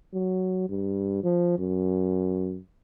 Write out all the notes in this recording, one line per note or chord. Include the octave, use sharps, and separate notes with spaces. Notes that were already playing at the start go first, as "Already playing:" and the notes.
F#3
G2
F3
F#2